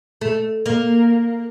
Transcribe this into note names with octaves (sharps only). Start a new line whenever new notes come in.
A3
A#3